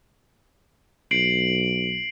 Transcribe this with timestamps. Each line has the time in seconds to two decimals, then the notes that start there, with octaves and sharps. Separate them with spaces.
1.11 B1 C7 D7 F#7